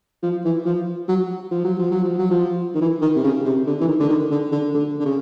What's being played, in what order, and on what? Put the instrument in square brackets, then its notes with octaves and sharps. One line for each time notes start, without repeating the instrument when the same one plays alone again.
[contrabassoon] F3
E3
F3
F#3
F3
F#3
F3
F#3
F3
F#3
F3
D#3
E3
D#3
C3
C#3
C3
D3
E3
D#3
D3
D#3
D3
D3
D3
D3
C#3